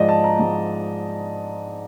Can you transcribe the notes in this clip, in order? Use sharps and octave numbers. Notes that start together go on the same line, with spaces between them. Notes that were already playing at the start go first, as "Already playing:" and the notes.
Already playing: G#2 F3 G#3 D5 D#5
A5
A#5
G#2 F3 G#3